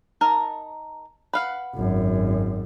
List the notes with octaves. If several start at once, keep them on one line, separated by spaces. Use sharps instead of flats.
D#4 A#4 A5
B4 F5 F#5
G#1 F#2